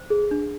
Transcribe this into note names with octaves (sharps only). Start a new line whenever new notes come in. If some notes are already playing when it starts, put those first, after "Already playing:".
Already playing: C5
G#4
D4